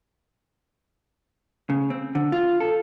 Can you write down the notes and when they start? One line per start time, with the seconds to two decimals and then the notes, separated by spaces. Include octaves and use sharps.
1.70 C#3
1.90 C4
2.15 D3
2.32 F4
2.60 A4